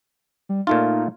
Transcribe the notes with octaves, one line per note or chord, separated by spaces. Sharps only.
G3
A#2 A3 D#4 F4